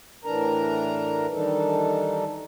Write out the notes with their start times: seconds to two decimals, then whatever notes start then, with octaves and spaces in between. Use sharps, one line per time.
0.25 A2 E3 D4 A#4 A#5
1.32 D#3 E3 G3 D4 D#4 A4